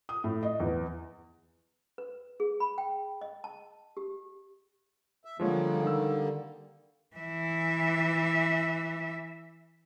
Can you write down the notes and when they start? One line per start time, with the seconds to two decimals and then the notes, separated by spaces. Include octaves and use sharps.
0.09 D#6
0.24 A2
0.43 D#5
0.60 E2
1.98 B4
2.40 G#4
2.60 B5
2.78 G5
3.21 D#5
3.44 A5
3.97 G4
5.25 E5
5.40 D3 F3 G3 G#3 A#3 C#5
5.83 D#3 E6
7.16 E3 E5